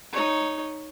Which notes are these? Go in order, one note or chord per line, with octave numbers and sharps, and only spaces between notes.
D#4 C#5